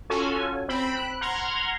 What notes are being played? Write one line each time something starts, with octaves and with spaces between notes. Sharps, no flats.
C#4 F4 F#4 A4 G#5
C4 B5 E6 D7
F#6
F#5 A#5 C6 F6 G#6 A#6